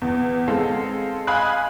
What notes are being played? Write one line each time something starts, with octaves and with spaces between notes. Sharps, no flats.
E2
G#3 C4 A4 F5
D#5 F5 G#5 B5 D#6 F#6